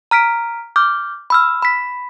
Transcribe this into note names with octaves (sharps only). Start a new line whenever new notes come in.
A#5 F6 B6 D7
D6 F6 G6
B5 E6 F6
B5 B6